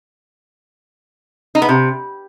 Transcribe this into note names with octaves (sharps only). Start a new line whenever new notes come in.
D#4
B3
C3